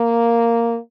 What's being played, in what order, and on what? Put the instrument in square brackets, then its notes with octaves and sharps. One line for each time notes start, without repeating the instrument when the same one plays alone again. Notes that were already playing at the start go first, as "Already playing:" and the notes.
Already playing: [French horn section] A#3